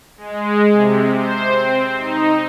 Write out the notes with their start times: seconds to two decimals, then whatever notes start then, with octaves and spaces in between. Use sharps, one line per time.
0.18 G#3
0.73 C3
1.14 C5
1.53 C4
1.97 D#4